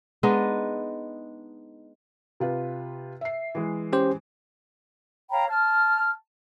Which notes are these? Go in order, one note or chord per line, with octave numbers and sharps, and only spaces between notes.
G#3 B3 D4 D#4
C3 F4 B4
E5 C7
E3 G#3
C#4 G4 C5
C#5 F5 G5 A#5 B5
A5 F6